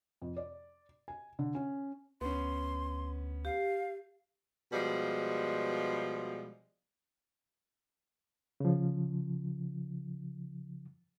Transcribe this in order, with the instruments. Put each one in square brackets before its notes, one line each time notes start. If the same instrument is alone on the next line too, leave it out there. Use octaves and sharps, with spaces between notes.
[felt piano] F2
D5
G#5
D3
C#4
[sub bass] D2 [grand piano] B3 C#4 [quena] C6
[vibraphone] G4 [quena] F5
[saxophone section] B2 F3 G3 G#3
[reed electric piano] C#3 F3